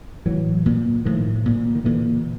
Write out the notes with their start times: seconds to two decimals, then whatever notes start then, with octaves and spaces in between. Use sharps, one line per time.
0.25 A2 E3 F#3
0.66 A#2
1.05 A2 D#3 F3
1.46 A#2
1.75 D#3
1.85 A#2 D3 E3